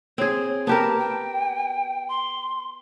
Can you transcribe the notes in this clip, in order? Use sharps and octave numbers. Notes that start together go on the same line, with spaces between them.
C4 G#4 C#5
B3 G4 A#4 A5
G5
C6